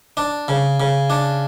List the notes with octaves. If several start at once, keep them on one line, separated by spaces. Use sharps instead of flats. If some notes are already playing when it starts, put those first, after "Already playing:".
D4
C#3
C#3
D4